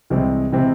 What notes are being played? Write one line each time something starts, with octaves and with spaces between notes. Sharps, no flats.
C2 C3 E3 G#3 C4
C3 E3 G#3 C4